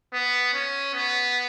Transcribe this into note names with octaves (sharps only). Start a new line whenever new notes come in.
B3
C#4
B3